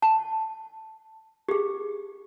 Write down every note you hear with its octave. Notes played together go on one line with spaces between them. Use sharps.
A5
G4 G#4